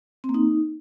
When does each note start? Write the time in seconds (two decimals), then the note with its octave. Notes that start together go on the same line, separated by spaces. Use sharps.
0.24 C4
0.29 A#3
0.34 D#4